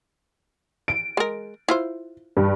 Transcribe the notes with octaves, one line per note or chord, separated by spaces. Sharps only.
D7
G#3 A#4
E4 F4 C5
G2